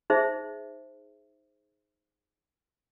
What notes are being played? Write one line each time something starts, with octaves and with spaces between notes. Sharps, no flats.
D#4 G#4 C5 E5